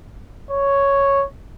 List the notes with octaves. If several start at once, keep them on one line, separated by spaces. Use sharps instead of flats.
C#5